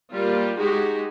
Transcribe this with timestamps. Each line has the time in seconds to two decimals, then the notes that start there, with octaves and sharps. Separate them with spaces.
0.12 G3 A#3 F4
0.59 G#3 D#4 F#4 G4